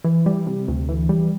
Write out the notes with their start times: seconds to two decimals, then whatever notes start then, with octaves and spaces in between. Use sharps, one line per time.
0.04 E3
0.26 G3
0.47 C3
0.68 D2
0.89 E3
1.09 G3